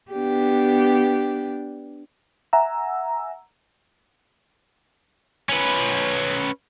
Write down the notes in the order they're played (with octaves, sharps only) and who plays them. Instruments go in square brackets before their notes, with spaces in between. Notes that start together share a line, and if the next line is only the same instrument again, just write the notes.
[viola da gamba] B3 D4 G4
[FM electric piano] E5 F#5 G#5 A#5 E6
[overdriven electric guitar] C#4 B4